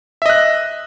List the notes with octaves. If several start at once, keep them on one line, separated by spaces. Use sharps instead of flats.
D#5 E5 F#6